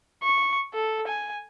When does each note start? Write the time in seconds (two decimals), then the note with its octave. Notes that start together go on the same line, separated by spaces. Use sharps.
0.23 C#6
0.74 A4
1.07 G#5